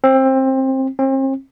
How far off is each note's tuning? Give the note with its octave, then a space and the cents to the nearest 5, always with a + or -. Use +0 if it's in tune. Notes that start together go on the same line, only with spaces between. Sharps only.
C4 +20
C4 +40